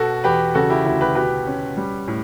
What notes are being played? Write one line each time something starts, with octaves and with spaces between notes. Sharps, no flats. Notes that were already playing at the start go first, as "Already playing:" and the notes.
Already playing: B2 F#4 A4
E2 G4 B4
C#3 F#4 A4
E4 G4
D2 E4
G4 B4
B2 G4 B4
C#4
G3
A2